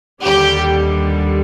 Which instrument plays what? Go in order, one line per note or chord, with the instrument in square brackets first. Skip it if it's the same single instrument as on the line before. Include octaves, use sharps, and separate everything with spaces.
[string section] D#2 D3 G3 G4